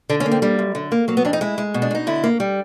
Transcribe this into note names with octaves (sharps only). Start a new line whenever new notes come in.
D3 D4
C#4
A#3
C4
G3 A#3
F#2
D3
A#3
F#3 A#3
B3
F2 D4
D#4
G#3 E4
G#3
B2
D4
B2 D#4
D3 E4
A#3
G3